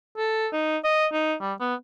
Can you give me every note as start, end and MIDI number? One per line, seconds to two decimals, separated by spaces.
0.17 0.47 69
0.53 0.77 63
0.84 1.06 75
1.12 1.34 63
1.41 1.53 55
1.60 1.74 59